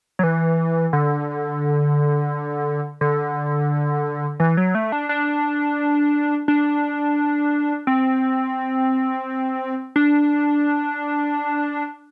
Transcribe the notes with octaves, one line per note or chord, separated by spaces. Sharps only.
F#3
E3
D3
D3
E3
F#3
A3
D4
D4
D4
C4
D4